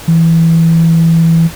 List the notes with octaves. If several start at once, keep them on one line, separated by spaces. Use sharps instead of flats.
E3